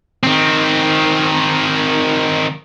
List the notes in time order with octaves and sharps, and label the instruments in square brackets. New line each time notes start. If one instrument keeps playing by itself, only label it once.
[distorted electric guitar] D#3 C4